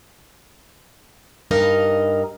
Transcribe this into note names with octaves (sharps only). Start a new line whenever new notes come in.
G2 D#4 A#4 D#5 F5